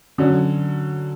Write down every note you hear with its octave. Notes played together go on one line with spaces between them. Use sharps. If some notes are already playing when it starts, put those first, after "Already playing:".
D3 F#3 C#4